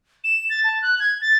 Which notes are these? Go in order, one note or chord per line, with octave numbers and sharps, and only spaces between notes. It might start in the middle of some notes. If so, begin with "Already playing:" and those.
E7
A6
A5
F#6
G#6
A6